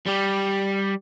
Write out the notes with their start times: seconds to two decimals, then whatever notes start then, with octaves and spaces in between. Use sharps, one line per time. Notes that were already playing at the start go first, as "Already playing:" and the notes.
0.06 G3 G4